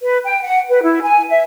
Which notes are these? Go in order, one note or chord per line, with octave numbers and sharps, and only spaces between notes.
B4
G5
F#5
B4
E4
G#5
E5